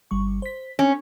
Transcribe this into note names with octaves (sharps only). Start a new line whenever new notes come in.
G1 G3 C#6
C5 B6
C4 C#4